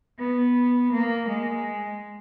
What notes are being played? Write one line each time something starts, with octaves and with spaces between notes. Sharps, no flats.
B3
A#3
G#3